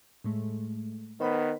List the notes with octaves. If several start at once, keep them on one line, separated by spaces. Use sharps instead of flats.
A2 G#3 A3
D#3 B3 C5 B5